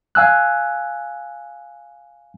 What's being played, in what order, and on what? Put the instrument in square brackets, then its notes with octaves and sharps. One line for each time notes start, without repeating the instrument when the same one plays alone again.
[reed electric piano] F5 G#5 E6 F#6